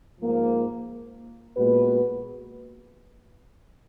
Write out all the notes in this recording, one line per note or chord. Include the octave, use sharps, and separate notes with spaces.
G#2 F3 A#3
A#2 G#3 B3 F#4 B4